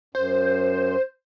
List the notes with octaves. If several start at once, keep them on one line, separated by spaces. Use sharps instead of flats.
F#2 C5